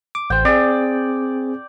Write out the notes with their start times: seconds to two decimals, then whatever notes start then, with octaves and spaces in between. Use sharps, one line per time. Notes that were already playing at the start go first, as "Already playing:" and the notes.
0.15 D6
0.30 A1 C5 G5
0.45 C4 G#4 D5